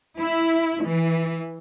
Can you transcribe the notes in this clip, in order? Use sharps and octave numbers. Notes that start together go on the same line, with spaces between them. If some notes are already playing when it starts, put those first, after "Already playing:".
E4
E3